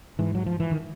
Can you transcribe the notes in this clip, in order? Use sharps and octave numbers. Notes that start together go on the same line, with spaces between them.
G#2 E3
F#3
F3
E3
D#3